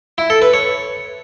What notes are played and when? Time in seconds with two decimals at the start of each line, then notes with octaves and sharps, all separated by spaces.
0.18 E4
0.30 A4
0.42 B4
0.53 C#5